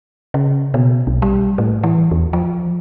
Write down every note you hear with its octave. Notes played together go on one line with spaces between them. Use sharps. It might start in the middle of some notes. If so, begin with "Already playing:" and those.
C#3
B2
B1
G3
A2
E3
E2
F3